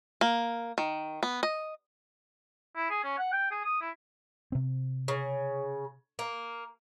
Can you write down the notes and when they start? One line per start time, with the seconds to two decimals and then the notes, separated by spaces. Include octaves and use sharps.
0.21 A#3
0.78 D#3
1.23 B3
1.43 D#5
2.76 E4
2.90 G#4
3.04 C#4
3.18 F#5
3.33 G5
3.51 G#4
3.65 D#6
3.81 E4
4.52 C3 C4
5.08 C#3
6.19 A#3